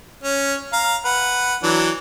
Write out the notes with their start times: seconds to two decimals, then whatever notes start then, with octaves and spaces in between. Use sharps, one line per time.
0.24 C#4
0.73 F5 A#5
1.05 B4 F#5
1.63 E3 F#3 D4